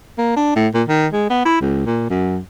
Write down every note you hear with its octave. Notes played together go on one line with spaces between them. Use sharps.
A#3
D4
A2
A#2
D#3
G#3
B3
E4
C#2
A#2
F#2